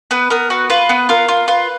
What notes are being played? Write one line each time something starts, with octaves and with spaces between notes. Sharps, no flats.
B3 B4
B3 A#4
F#4 B4
F4 B4
B3
F4 A#4
F4
F4 B4